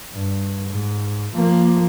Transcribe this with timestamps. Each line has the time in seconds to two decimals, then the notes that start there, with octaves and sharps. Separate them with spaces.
0.14 G2
0.70 G#2
1.34 F3 A#3